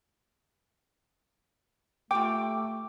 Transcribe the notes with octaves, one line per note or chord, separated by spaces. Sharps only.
A3 F4 G4 G5 D6